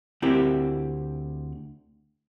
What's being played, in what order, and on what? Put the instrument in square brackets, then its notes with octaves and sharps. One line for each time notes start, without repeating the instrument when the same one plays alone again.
[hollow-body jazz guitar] D2 C4 E4 G4 A#4